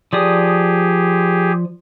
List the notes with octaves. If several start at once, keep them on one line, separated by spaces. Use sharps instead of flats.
F3 G4 G#4 D5 D#6